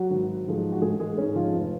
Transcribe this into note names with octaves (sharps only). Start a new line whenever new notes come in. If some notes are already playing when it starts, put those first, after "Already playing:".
Already playing: F#3 F#4
G#1
G#2 F3 G#3
F#4
A1 G#3 G#4
G#3 G#4
G#2 G#3 C#4
F3 F4
F1